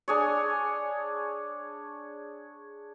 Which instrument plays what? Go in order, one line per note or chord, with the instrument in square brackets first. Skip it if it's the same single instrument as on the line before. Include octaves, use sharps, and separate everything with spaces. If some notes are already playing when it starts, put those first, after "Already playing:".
[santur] D4 G#4 C#5